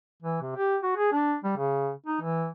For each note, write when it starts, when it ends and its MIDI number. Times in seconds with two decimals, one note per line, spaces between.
0.23 0.39 52
0.42 0.55 48
0.56 0.77 67
0.83 0.92 66
0.97 1.11 68
1.12 1.35 62
1.44 1.54 55
1.58 1.91 49
2.06 2.20 63
2.22 2.47 52